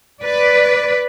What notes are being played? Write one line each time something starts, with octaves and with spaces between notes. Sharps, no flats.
B4 D5